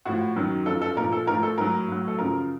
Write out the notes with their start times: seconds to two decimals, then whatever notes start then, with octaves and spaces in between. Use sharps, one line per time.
0.05 A2 F3 F#4
0.36 F#2 D#3 F#3
0.66 F#2 F3 A4
0.82 A4
0.96 A#2 A#4
1.00 F3
1.12 A4
1.27 A2 A#4
1.30 F3
1.43 A4
1.58 A2 F#3 A#4
1.88 A2 F#3
2.08 A4
2.18 F#2 C#3 F3 A#4